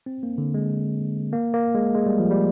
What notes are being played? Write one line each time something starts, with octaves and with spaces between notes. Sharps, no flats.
C4
A#3
D3
G#3
A#3
A#3
G#3
G#3
G3
F3
G3